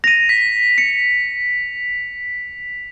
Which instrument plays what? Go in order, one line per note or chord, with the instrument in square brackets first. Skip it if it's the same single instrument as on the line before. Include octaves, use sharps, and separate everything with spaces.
[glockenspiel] A#6 D#7 [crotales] F7
[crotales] B6
[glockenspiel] C#7